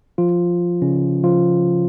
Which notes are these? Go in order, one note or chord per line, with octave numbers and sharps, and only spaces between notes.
F3 F4
C#3 C#4
F3 F4